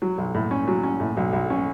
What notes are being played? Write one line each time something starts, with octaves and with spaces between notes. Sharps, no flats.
F#3
B1
A2
C#4
F#3
C#4
A2
B1
B1
C#4